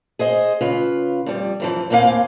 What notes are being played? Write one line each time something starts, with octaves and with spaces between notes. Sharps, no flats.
G#4 C5 D#5
C#3 F4 B4
F2 G3
F#2 E3 F3
D#2 A2 A#3 C4 F5 G#5